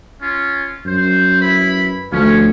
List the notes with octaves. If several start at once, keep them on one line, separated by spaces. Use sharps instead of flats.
C#4 F4
F#2 C5
E4 B4 B5
D2 F3 A3 C#4